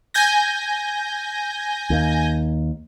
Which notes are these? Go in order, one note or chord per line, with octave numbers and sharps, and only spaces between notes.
G#5 G6 A#6
D#2